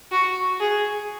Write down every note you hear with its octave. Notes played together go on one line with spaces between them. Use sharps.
F#4
G#4